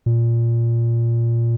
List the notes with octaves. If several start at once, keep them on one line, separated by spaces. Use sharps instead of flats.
A#2